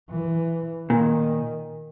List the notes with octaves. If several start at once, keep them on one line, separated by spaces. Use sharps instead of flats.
E3
A#2 D#3